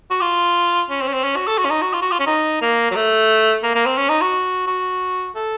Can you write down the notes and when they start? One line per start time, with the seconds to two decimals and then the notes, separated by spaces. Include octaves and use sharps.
0.11 F#4
0.21 F4
0.91 C#4
1.01 C4
1.08 C#4
1.14 C4
1.24 C#4
1.36 F#4
1.47 A4
1.58 F#4
1.65 C#4
1.70 D#4
1.82 F#4
1.93 F4
2.02 F#4
2.12 F4
2.20 C#4
2.27 D#4
2.62 A#3
2.91 F#3
2.96 A3
3.63 A#3
3.75 A#3
3.86 C4
3.98 C#4
4.09 D#4
4.21 F#4
4.67 F#4
5.36 A4